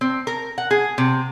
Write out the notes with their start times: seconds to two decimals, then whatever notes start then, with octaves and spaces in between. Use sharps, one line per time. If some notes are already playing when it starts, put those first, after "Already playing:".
0.01 C4
0.27 A#4
0.58 F#5
0.71 G#4
0.98 C3